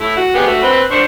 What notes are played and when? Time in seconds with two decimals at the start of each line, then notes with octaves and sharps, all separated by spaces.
0.01 A3 E4
0.17 F#4
0.35 B3 G4 G#4
0.47 A3 F#4
0.62 C4 B4
0.91 D4 C5 C#6